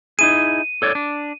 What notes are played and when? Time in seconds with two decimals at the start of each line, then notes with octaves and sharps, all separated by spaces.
0.19 D#4 E4 G#4 D#7
0.82 A4 C#5 D5
0.95 D4